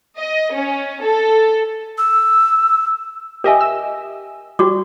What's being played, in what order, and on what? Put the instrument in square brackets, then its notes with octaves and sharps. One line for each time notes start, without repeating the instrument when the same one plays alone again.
[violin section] D#5
C#4
A4
[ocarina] E6
[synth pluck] G4 D#5 E5 [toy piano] A#4 G#5
[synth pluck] E6
[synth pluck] G3 [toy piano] F#4 C#6 D6